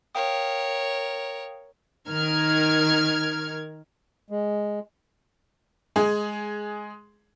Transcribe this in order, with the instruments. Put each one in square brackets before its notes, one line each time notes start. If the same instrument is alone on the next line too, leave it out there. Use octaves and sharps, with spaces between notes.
[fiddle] A#4 C#5 [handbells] F5 G5 D#6
[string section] D#3 A#4 F6 G#6
[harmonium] G#3
[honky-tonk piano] G#3 G#4